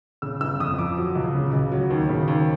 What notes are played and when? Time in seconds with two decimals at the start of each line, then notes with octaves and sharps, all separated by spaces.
0.22 C#3 E6
0.41 G1 E6
0.60 F2 D#6
0.78 F3 D6
0.97 F#3
1.16 C#2
1.35 C#3
1.53 C#2
1.72 F#3
1.91 D#2
2.09 C#3
2.28 D#2